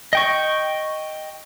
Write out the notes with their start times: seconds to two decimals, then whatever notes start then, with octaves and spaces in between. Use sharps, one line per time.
0.13 D#5 G5 C#6